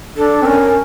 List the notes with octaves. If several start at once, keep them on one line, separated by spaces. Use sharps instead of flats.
D4 A4
C4
C#4 A#4